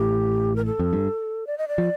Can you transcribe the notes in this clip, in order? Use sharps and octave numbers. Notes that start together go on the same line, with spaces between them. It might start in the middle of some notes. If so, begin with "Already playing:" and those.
Already playing: A1 A2 G4
A#4
A4
F2
G2
D5
D#5
D5
F3